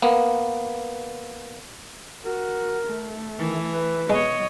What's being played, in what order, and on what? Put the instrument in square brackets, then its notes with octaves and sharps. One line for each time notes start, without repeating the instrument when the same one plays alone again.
[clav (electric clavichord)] A#3 B3
[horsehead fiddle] F#4 [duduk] A#4
[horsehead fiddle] A3
[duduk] D#3 [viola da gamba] E3
[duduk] B4
[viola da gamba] B2 C#5 [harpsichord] G#3 [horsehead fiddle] D#5